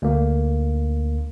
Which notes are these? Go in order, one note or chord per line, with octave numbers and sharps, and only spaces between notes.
D2 A#3